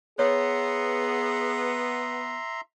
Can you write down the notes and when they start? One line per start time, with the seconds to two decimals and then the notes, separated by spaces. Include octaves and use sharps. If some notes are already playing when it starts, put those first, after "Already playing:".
0.19 B3 G#4 C#5 E5 A#5 C6